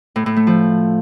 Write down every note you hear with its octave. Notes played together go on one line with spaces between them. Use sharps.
A2
A2
A3
F3